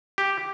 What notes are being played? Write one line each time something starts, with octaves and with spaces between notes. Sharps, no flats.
G4